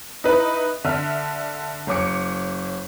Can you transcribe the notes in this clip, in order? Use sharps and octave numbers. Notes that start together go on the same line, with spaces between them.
D#4 E4 B4
D3 E5 F6
F#1 C#5 D6 C#7